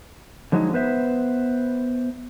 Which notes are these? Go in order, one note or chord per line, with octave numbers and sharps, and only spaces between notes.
D3 F3 F#3 G#3 C4 D#4
B3 B4 C5 E5